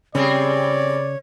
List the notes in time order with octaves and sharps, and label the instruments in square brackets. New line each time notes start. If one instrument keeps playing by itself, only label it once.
[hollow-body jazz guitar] C#3 [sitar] G3 C4 G#4 [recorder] C#5 [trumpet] D5